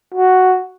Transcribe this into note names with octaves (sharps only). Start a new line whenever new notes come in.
F#4